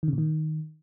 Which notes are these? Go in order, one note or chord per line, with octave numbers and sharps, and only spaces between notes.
D#3
C#3
A#2
D#3